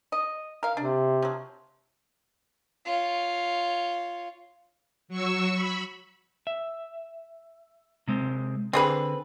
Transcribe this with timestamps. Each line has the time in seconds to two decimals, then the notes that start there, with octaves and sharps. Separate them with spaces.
0.12 D#5
0.63 A#4 F5
0.77 C3 D4
1.22 F3 F#3
2.85 F4 C#5
5.08 F#3 C#6 E6
5.54 B5
6.47 E5
8.08 C3 G#3 C4
8.73 D3 C4 G#4 B4